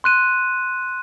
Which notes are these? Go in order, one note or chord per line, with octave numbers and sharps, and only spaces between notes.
C6 F#6 D#7